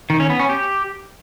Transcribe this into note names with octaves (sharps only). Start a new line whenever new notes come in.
D#3
C#4
B3
C#4
G4